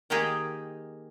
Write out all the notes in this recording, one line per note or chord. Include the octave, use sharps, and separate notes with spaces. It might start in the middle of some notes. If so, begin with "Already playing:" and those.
D#3 A#3 D#4 G4 G#4 G5